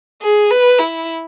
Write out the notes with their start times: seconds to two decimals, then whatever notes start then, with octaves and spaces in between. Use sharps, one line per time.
0.22 G#4
0.51 B4
0.79 E4